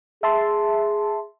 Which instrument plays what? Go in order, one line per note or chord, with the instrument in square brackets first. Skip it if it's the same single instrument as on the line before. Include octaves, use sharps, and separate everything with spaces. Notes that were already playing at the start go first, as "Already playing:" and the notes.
[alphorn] G#4 [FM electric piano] E5 A5 C6